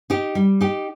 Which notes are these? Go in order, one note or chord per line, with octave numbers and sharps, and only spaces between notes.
D#4 G4
G3
D#4 G4